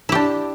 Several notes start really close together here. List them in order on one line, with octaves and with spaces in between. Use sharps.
E4 G4 D4